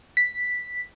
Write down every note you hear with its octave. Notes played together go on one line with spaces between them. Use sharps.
B6